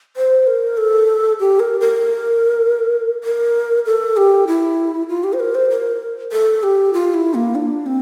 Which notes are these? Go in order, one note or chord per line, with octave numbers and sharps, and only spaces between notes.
C5
A#4
A4
G4
A#4
A#4
A#4
A4
G4
E4
F4
G4
C5
A#4
C5
A#4
A4
G4
F4
E4
A#3
D4
C4